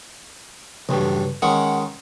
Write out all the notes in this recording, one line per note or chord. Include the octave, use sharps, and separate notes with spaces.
B1 G2 C#3 E3 G5
D#3 G#3 C#4 F#5